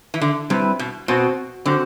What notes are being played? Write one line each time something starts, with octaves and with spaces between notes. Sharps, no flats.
E3
D3
C3 G3 C4 E4 B4
B2
B2 C4 F#4 C5
D3 C4 F#4 C5